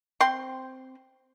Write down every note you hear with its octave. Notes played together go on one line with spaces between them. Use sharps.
C4 C6